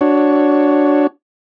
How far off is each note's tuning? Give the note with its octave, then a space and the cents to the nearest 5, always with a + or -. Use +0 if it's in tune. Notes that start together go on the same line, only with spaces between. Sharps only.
D4 -5 F#4 +0 C#5 +0